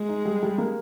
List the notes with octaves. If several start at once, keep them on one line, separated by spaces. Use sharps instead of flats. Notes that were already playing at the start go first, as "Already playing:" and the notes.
Already playing: G#3
D#4
G3
G3
A#3